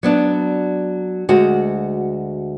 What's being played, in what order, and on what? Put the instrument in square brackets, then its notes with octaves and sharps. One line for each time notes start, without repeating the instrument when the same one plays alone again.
[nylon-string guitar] F#3 B3 D4
D2 G#3 F#4